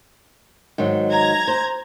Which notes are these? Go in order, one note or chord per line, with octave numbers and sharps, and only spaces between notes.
G#2 D#3 F#3
A#5 G#6
C5